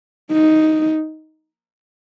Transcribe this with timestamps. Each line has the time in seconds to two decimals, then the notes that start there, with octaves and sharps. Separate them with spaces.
0.32 D#4